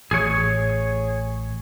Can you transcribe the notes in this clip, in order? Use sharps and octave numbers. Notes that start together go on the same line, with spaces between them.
A1 G#4 C#5